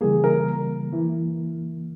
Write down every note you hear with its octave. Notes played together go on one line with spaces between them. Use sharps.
C#3 E3 G3 A#3 G#4
A#4
E3 A#3 E4